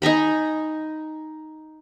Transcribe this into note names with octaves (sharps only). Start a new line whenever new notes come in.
D#4 G#5 A#5 B5